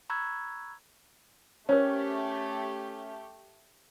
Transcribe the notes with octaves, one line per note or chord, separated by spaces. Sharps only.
A#5 B5 C#6 E6 F#6 G#6
A3 C#4 G4 A#4 C5 C#5